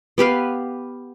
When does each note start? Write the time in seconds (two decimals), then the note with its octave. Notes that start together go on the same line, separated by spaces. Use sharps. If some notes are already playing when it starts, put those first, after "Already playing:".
0.18 B3 G4 B4 F5